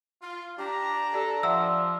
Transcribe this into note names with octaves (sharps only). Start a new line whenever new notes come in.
F4
D4 G4 A#5
G4 A4 D5
F3 D5 E5 F#5 E6